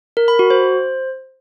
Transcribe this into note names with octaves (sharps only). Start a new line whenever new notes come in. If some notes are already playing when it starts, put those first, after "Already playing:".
A#4
B5
F#4
C5